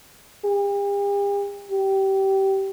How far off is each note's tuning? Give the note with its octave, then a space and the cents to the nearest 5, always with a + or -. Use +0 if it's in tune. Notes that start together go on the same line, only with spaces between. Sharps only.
G4 +45
G4 -20